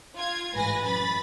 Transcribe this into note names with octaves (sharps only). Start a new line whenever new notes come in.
F4 G#6
A1 G#2 B4 G#5 A#6
F#2 B5 A6